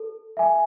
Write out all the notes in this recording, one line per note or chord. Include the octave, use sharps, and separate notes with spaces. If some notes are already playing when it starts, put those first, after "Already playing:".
Already playing: A4
E5 G#5